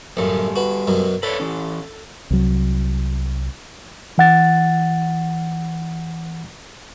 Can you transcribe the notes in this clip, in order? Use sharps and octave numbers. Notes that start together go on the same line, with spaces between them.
A1 F#2 G3 A4
F#4 B4
F#2 B2 F#3
A4 B4 C#5 D5
E3 C#4
C2 F#3
E3 F#5 A6